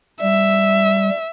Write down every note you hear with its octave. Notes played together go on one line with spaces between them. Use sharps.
G3 E5